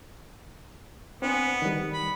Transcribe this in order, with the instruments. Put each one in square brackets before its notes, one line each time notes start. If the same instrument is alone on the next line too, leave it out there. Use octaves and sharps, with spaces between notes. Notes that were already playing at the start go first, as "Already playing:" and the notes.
[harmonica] B3 [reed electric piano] C4 D4 G#5
[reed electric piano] D#3 G3
[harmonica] B5